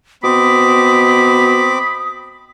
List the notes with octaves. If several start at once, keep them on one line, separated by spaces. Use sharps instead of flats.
B2 C4 B5 D6 D#6